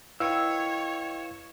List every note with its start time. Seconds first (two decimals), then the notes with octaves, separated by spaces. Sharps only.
0.20 E4 B4 C#5 D#5 F5 G5 E6